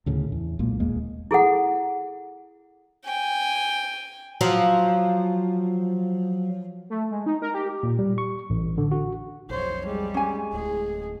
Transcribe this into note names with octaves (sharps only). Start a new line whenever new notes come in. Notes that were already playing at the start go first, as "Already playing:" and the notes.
D2 A2 C#3
E2
B1 A#2 G#3 A#3
E1 D#2 G#3 A#3
E4 G#4 A4 F#5
G5 G#5
F3 F#3
A3
G#3
D#4
A#4
G4
A#2
G3
C#6
A1
D3
F#4
B1 F2 C5 C#5
G3 G#3
G#3 C#4 G#5
D1 A2 G#4